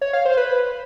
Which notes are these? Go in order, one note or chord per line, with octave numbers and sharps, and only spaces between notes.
C#5
F5
C5
B4